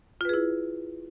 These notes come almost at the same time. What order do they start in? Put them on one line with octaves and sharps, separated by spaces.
F4 B4 G#4 E4